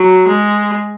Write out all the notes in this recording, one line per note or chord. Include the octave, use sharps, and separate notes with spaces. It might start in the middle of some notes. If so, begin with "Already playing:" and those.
Already playing: F#3
G#3